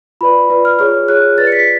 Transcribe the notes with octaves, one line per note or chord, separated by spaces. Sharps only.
F4 B4 D5 B5
F4 B4 D5
F6
F4 G#4 C#5 F6
F4 G#4 C#5 F#6
F4 B4 D5 A6
C#7
B6